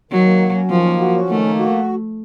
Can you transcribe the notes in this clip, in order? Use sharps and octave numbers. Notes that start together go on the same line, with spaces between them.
D#3 F#3
A#3
F#4
C#4
D#3 F3
A#3
F#4
C#4
D#3 A3
A#3
F#4